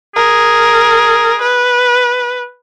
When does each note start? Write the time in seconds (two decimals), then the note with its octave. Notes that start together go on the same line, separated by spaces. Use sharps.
0.16 G#4 A#4
1.42 B4